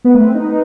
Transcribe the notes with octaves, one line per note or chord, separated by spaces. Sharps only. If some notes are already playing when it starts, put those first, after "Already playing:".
B3 B4
A3
C4
D#4